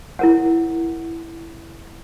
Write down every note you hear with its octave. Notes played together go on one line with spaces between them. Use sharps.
E4 A#4 F#5